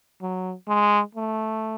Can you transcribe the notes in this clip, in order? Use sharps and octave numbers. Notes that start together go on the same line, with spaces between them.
F#3
G#3
A3